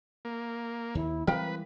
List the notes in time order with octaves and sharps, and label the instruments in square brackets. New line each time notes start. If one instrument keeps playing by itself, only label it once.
[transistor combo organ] A#3
[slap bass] D#2 [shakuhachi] E4
[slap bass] E3 G3 G#3 [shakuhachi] C4 [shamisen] A#4 F5 G5 [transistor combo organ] B4